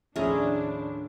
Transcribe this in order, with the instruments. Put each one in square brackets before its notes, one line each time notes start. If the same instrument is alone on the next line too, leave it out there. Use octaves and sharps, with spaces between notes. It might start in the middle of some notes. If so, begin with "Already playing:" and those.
[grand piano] D#2 A2 F3 [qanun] C#4 G#4 A#5 [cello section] D4 [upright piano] E5